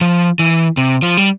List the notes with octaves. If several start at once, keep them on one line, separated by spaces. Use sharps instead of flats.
F3
E3
C3
F3
G3